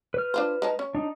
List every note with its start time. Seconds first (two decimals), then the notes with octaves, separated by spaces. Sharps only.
0.14 B4 F6
0.34 D4 F4 C5
0.62 G#3 D#4 A5
0.79 C#4
0.95 D4 D#4